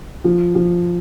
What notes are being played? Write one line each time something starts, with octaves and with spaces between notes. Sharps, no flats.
F3
F3